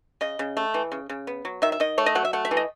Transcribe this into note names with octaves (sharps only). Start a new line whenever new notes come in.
C#3 D#5
C#3
A3
E3
C#3
C#3
B3
F#3
D#3 E5
E5
D#3 D#5
A3 C#5
D#5
F#3 F#5
E5
A3 F#5
E5
E3
D#5